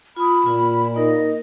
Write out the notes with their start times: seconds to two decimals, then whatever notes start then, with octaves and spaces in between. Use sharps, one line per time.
0.16 F4 B5 D#6
0.46 A#2 F4
0.95 A#3 D#4 A#4 D#5